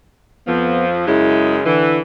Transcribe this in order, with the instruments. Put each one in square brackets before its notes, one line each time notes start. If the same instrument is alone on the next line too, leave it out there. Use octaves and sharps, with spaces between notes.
[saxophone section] F2 F3 [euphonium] B3
[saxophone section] F#2 C#3 G#3 [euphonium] E4
[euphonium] D3 [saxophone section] E3